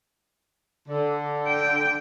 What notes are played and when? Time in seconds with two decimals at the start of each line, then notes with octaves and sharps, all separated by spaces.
0.88 D3
1.48 G5